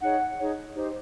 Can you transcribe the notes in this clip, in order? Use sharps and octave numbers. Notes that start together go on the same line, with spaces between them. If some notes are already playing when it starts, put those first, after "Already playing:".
D#4 G#4 C#5 F#5
D#4 G#4 C#5
D#4 G4 C5